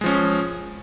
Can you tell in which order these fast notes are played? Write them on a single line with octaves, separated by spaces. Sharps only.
G#3 F3 C#4